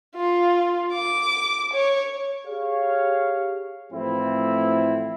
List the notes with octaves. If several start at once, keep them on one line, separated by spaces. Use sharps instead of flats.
F4
D6
C#5
G4 G#4 C#5 F5
A2 E3 F3 A3 C4 E4